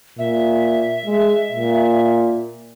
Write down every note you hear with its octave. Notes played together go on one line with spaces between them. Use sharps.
A#2 E5
G#3
A#2